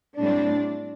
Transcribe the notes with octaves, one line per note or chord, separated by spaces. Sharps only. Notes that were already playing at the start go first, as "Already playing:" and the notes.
A2 G3 C4 D4